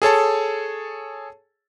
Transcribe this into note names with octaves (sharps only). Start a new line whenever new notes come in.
G#4 A4 C#5 A5